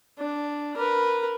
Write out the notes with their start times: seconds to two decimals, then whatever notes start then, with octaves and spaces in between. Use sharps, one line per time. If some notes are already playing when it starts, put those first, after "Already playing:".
0.19 D4
0.77 A#4 B4